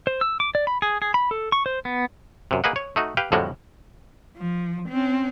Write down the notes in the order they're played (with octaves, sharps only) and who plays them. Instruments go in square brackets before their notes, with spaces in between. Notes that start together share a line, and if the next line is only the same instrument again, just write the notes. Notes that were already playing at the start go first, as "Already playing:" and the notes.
[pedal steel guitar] C5
E6
D6
D5
B5
G#4
G#4
B5
A4
C#6
C5
B3
[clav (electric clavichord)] F#2 C3
A#3 G#4 B4 D#5 F#5
C#5
A3 D#4 F#4
G4 B4 F5 G5
F2 A2 D3 G3 G#3 F#4
[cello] F3
C4 C#4